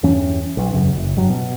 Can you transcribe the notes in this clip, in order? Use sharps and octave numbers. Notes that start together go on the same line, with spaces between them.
E2 G2 E3 C#4
B1
E1 F#2 C#3
F#1
G2 F#3
B2